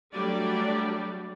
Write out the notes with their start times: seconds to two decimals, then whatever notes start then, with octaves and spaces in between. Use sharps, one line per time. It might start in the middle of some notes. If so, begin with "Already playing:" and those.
0.13 F#3 G3 A3 D4 D5